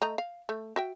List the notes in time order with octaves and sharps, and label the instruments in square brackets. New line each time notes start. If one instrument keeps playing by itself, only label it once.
[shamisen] A3 D#5 A#5
F5
A3
F#4 E5 G5